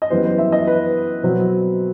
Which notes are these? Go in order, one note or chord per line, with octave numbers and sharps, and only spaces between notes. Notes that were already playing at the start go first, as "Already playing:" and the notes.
D#5
F#2 E3 G3 B3 C5
C5
E5
D#5
B4
B2 F#3 C4